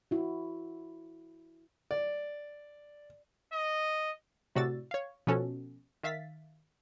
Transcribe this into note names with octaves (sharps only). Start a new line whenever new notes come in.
E4 F#4
D5
D#5
A2 C3 F#4 D5 E6 A6
C#5 F5
B2 F3 C#4 F#4 A4
D#3 E5 F5 A6 B6